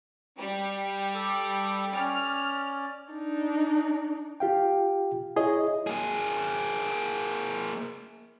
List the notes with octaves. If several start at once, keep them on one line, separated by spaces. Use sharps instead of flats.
G3
A4 D6
C#4 D5 F6
D4 D#4
F4 G4 F5 G5
E4 G#4 C#5 D#5
A#3 G#4